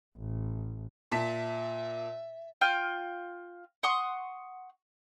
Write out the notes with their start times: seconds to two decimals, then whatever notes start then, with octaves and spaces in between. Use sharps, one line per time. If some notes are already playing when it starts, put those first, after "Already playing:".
0.18 A1
1.12 A#2 E5 A5 B6
2.61 F4 G5 F6
3.83 F#5 C6 C#6 D#6